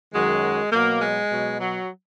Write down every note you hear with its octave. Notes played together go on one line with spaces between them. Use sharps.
F#2 D#3 F#3 G#3
B2 F#3 A#3
G#3
B2 F#3
F#3